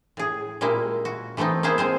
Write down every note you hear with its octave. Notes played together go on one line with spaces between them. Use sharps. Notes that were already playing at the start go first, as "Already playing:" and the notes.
A2 G#4
A#2 G3 G#3 A#3 E4
F#4
E3 A3 B3 C4 D#4
A#3 B3 E4 G#4 C5
G#3 C4 C5